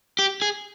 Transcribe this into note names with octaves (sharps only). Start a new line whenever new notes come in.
G4
G#4